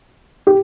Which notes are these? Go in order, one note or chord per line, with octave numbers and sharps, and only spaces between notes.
G4